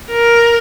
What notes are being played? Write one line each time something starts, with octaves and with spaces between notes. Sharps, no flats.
A#4